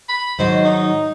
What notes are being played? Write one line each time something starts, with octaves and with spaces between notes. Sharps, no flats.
B5
G#2 D#3 F#3 C5
D#4